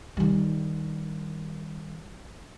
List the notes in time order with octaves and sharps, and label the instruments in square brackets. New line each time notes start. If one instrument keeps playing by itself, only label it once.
[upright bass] D#3 G3